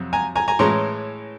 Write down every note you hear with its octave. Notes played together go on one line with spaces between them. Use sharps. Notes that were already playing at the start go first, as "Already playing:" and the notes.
Already playing: F2 C3 F#3
G#5 A#5
G#5 A#5
G#5 A#5
A2 E3 G#3 C#4 A#5 C6